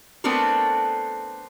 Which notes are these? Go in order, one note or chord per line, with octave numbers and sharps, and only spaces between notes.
A3 B3 C4 D4 A4 A#4